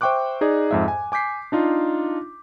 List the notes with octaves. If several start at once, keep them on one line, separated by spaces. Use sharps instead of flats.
C5 E5 G5 C#6 D6 F#6
D#4 G#4 D5
F2 G#2 E5
G#5
G#5 D6 G6 B6 C7
D4 D#4 F4